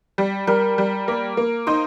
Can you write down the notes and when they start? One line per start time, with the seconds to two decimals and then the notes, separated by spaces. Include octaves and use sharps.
0.18 G3
0.47 G3 A#4
0.78 G3
1.08 A#3
1.37 A#3
1.67 D#4 C5